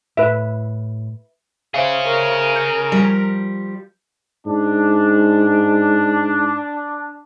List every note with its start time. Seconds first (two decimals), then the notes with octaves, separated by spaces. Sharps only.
0.17 A2 B4 E5
1.74 G#4 C5 C#5 E5 F5
2.07 A#4
2.56 G6 C#7
2.92 F3 G3
4.46 G#2 D4